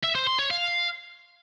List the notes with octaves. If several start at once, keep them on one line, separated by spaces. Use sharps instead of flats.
E5
C5
C6
C#5
F5